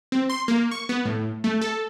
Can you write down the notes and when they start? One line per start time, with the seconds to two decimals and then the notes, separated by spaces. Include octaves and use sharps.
0.12 C4
0.30 C6
0.48 A#3
0.71 C#6
0.89 B3
1.05 A2
1.44 A3
1.61 A4